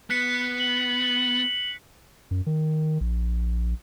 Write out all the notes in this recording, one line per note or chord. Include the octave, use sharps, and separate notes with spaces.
B3 F#6 B6 C#7
F#7
F#2
D#3
A#1